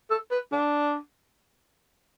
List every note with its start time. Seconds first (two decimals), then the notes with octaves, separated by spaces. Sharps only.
0.10 A4
0.31 B4
0.52 D4